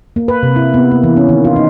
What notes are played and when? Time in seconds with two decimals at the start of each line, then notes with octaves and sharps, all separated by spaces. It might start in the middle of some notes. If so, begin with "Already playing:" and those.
0.16 A#3
0.28 B4
0.43 C3
0.56 E4
0.74 B3
0.92 A#3
1.04 E3
1.17 C#4
1.29 D#3
1.44 F4
1.56 D#4